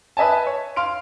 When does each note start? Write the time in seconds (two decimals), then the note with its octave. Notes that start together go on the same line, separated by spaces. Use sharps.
0.17 B4 D#5 E5 G#5 A5
0.47 C#5
0.76 F5 C6 F6 D7